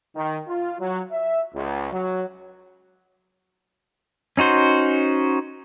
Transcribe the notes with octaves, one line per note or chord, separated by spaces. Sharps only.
D#3
F4
F#3
E5
C#2
F#3
C#4 D#4 F#4 C5